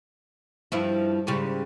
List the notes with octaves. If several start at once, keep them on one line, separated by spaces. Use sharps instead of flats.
G2 F3 E4
G#2 C#3 G3